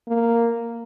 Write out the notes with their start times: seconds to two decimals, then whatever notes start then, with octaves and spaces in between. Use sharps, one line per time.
0.08 A#3